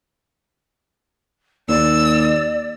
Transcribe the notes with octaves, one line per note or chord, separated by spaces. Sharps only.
D#2 D5 E6